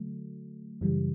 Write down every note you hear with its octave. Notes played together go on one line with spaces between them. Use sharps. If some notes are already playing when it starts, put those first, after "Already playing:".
Already playing: D3 F#3 A3
F#2 C#3 E3 G3